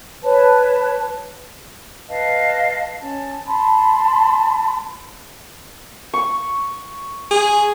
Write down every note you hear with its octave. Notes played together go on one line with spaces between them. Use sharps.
B4 C#5 A5
B4 D#5 F5 A5
C#4 A5
A5 B5 C6
C#6
G#4